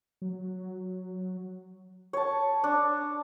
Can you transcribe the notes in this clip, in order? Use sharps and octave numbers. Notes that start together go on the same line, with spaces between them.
F#3
C#5 A5
D4